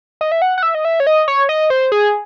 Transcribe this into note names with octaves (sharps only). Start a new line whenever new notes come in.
D#5
E5
F#5
F#5
E5
D#5
E5
C#5
D#5
C#5
D#5
C5
G#4